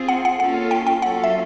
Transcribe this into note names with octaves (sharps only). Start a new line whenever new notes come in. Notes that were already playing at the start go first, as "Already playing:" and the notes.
Already playing: C4 F4 G#4
F#5
F#5
A#3 C#4 F4 A4 F#5
G5
G5
F#3 A#3 C#4 F4 A4 F#5
E5